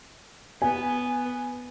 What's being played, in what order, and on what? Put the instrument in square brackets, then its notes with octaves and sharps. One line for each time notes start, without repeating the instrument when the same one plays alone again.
[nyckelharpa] B3 B4 [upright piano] G#5